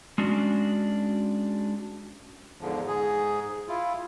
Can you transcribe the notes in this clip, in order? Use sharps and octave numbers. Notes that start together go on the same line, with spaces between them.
G#3 C#4 D4 F#4
E2 G#2 D3 F3
G#2 G#4
E4 F4